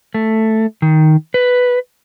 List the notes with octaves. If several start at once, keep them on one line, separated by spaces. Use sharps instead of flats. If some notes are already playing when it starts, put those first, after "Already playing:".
A3
D#3
B4